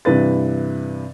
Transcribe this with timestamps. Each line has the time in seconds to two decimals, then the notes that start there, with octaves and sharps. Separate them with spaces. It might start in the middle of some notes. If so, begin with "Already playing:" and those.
0.05 G2 C3 E3 B4 A6